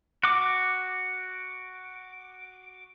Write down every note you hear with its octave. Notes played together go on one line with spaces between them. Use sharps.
F#4 D6